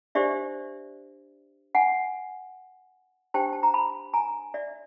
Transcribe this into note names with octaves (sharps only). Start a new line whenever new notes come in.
D4 G4 C5 D5 E5
F#5 G#5
D4 G4 C5 G5 A5
A5
A#5
A5 B5
G#5 A#5
D5 E5